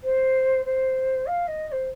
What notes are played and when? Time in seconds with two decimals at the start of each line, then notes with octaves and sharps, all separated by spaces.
0.03 C5
0.65 C5
1.26 F5
1.47 D#5
1.67 D#5
1.72 C5